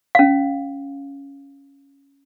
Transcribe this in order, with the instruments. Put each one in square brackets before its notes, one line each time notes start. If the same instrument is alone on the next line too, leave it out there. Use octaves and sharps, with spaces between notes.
[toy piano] C#4 F5